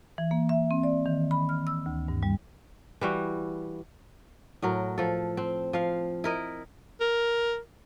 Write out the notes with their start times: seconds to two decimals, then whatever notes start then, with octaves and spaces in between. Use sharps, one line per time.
0.18 E3
0.31 A#3
0.49 E5
0.71 C4
0.83 D5
1.06 D#3
1.31 B5
1.49 F6
1.67 E6
1.86 D2
2.08 G2
2.23 G3
3.01 E3 G3 F#4
4.62 A2 F#3 A#4
4.98 F3 A4
5.37 C4
5.73 F3 F5
6.24 E4 A#4 D#5
7.01 A#4